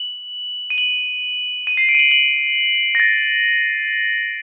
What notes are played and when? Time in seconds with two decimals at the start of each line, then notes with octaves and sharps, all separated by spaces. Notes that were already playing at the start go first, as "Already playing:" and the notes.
Already playing: F#7
0.70 D#7
0.78 F#7
1.67 D#7
1.77 C7
1.89 D7
1.95 D#7
1.99 F#7
2.11 F#7
2.95 A#6
3.00 A6